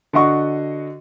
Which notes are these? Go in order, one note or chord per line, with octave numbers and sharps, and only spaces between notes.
D3 F#4 D#5 C#6